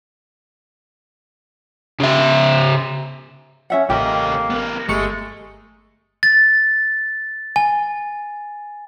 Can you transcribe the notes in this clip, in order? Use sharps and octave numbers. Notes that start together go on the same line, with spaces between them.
C#3 E5
C#4 E5 F#5
A1 C#3 A#3 G4 D#5
B3 A#4
G1 G#3 A3 C#6 C#7
A6
G#5